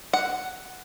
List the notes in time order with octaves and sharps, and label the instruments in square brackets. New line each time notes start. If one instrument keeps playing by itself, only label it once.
[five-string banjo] F#5